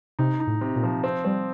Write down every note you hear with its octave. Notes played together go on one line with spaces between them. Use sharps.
C3 D#4
D#4
A2
C3
A#2
F3
C4
G3 C4